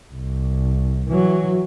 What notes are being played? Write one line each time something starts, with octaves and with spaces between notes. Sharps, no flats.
C2
E3 F#3